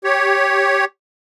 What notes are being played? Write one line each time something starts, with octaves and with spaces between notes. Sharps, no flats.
G4 C#5